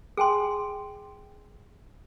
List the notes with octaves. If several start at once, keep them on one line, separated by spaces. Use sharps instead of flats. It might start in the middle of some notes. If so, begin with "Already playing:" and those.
G#4 G5 G#5 C6